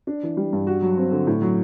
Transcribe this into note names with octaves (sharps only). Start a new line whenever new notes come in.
D4
E3
G3
G2
F#4
F#3
C4
D3
A2
F#3